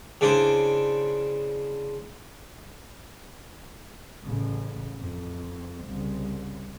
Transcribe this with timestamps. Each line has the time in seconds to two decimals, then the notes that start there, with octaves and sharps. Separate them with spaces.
0.21 C#3 D4 E4 C5
4.24 A1 C#3
4.99 F2
5.86 C2 C#3